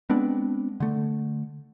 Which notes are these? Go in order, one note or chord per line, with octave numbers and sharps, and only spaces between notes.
G#3 B3 C4 D4
D3 A3